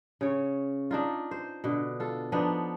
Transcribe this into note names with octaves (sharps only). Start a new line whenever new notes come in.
C#3 C#5
D4 D#4 F4
C5
B2 D3
F4 A4
F3 B3 D4 D#4